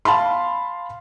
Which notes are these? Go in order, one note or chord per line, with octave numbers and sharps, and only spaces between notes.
F5 A5 B5 C6